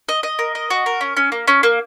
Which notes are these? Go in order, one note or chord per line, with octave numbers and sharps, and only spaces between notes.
D#5
D#5
A#4
D#5
F#4
A#4
C#4
C#4
A#3
C#4
A#3